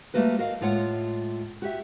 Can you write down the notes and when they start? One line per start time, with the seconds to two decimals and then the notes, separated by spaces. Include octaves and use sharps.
0.14 G3 A3 A#3 F#4 B4
0.39 F#4 A#4 D#5 F5
0.61 A2 G#3 F4 C#5 F#5
1.62 F#4 G4 E5